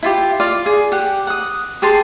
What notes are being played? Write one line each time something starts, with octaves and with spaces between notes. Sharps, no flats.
E4 F4 G4
F4 D5 F5 D6
G#4
G4 F#5
F#5 D#6
G4 G#4 A5 C6